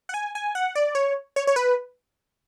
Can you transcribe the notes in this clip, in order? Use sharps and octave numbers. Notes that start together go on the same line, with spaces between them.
F#5
G#5
G#5
F#5
D5
C#5
C#5
C#5
B4